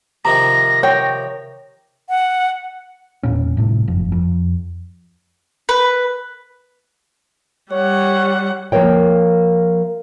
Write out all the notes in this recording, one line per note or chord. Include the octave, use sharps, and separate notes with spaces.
C3 D#3 F3 A#5 A#6
C#5 G5
F#5
E1 A#2 C#4
G1 A2 C3
F#1 F2
F2
B4
G3 C#5 F#5
F3 A#3 A#4 C#5 G5